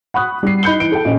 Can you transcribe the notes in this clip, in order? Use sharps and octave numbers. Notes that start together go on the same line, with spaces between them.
F#5 B5 C#6 D#6 F#6
G3 C7
D#4 B5 G6 C#7 G7
E3 D7
A4 G5
A#1 C#4 D#5